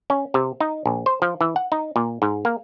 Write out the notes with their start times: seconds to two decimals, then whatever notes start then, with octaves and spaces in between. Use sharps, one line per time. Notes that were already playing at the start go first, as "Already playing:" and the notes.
0.10 C#4
0.34 C3
0.60 D#4
0.86 A#1
1.06 C5
1.22 F3
1.41 E3
1.56 F#5
1.72 D#4
1.96 A#2
2.22 G#2
2.45 A#3